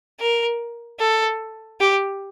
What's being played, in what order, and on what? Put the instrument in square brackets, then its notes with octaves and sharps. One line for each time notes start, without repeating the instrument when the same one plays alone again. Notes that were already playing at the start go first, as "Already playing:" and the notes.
[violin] A#4
A4
G4